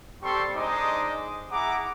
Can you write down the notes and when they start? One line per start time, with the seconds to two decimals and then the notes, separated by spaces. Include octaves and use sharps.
0.23 G3 C4 G4 A4 C6 C#6
0.55 G#3 D4 D#4 C5 D#5 D6
1.52 E4 G#4 F#5 A#5 D6